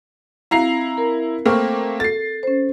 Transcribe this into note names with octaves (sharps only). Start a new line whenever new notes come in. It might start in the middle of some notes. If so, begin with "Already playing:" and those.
C4 E4 F5 A#5 C7
A#4
A3 A#3 C4 C#6 F6
A4 A6 C7
C#4 C5